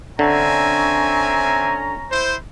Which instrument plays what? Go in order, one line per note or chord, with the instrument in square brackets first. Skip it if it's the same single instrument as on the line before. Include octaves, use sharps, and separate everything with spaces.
[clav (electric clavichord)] D3 [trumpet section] C4 E5 G#5 [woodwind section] C#4 A#5
[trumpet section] E4 C5